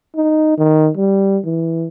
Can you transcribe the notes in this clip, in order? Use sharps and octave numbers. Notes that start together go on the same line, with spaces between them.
D#4
D#3
G3
E3